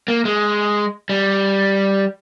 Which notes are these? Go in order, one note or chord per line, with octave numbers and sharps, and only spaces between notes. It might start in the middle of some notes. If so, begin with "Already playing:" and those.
A#3
G#3
G3